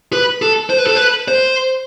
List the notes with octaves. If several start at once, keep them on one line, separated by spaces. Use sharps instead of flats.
B4
A4
C5
B4
A4
B4
C5